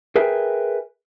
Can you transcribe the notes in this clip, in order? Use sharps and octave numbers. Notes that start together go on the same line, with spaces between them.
G#4 A#4 B4 E5 G5 G#5